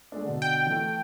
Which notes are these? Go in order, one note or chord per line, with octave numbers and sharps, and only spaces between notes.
G#3 A3 D4
B2 D3
G5
E3 A3